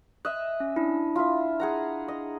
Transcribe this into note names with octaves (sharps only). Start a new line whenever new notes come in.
D#5 E5 F#6
C#4
D4 E4
F4 E5
G#4 F#5 A#5
D#5